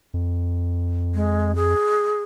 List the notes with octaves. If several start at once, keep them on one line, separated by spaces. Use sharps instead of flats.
F2
G#3
G#4